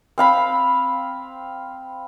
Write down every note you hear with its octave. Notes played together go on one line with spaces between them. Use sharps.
C4 F5 B5